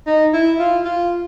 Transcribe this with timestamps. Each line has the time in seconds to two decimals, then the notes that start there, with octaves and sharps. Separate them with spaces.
0.07 D#4
0.33 E4
0.59 F4
0.85 F4